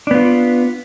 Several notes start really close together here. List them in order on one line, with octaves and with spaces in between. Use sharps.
D4 B3 F4